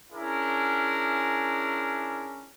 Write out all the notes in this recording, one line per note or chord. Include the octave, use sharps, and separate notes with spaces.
C#4 D4 E4 G#4 A#4